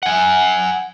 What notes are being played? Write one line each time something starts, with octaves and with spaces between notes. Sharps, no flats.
F#5 G#5